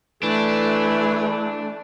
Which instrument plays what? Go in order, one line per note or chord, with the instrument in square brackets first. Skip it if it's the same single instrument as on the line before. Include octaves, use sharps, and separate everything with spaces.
[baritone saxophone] E3 [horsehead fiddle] A3 [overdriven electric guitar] D4